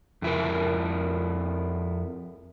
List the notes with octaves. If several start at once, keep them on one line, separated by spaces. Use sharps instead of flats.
F2 E4 A#4